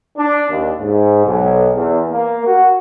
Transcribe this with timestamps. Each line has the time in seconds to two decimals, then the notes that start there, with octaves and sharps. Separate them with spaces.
0.18 D4
0.50 D#2
0.79 G#2
1.25 B1
1.74 E2
2.11 A#3
2.46 F#4